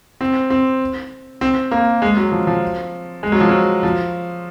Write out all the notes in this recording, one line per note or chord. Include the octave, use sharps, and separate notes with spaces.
C4
C4
C4
A#3
G#3
F#3
F3
F3
G#3
F#3
F3
F#3
F3